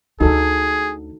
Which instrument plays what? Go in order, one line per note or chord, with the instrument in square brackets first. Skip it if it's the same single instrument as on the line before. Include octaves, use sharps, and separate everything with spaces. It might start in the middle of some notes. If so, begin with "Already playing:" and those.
[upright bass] D2 D3 [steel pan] D#4 F#4 A4 [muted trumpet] G#4